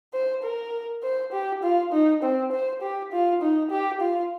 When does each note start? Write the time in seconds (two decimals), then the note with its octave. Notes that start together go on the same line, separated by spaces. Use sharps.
0.13 C5
0.43 A#4
1.03 C5
1.32 G4
1.63 F4
1.92 D#4
2.23 C4
2.52 C5
2.82 G4
3.12 F4
3.42 D#4
3.71 G4
4.01 F4